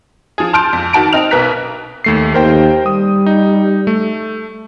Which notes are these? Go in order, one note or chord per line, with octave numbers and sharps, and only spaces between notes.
F3 G#4
A5 C6 F6 G6 D7
F2
D#3 F#4 A5 D7
C4 D#4 F6 F7
B1 B2 B3 A#4 F#6 B6
D#2 A3 C7
D#2 A#4 C5 G5
G3 D#6
D#4
A3